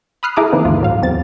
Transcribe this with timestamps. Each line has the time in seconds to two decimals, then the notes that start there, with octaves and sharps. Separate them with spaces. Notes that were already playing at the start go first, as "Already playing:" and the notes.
0.23 B5 D#6 F6 F#6 C7
0.36 E4 G#4 A4 A#5 D6 D#6
0.52 D#3 E3 A#3 C4 D#4
0.65 D2 G2 F4
0.81 A2 F#3 F5
1.02 E2 C4 A6